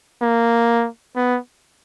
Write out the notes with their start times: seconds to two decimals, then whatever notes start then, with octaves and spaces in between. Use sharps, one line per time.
0.22 A#3
1.16 B3